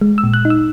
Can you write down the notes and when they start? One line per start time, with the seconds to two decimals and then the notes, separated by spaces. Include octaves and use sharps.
0.01 G#3
0.18 E6
0.24 A#2
0.34 F#6
0.45 D#4
0.50 E6